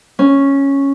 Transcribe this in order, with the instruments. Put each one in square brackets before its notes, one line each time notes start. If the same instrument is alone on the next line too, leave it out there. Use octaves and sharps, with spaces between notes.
[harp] C#4